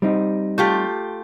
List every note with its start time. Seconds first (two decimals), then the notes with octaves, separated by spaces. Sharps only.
0.02 G3 C4 D#4
0.58 A3 F4 G4